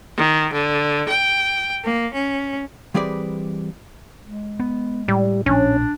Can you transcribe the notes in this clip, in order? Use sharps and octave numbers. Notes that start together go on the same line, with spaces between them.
D#3
D3
G5
A#3
C#4
E3 G3 C4 G#4 B4 D5
G#3
B3
A2 G3
A#1 A2 F3 C#4 D4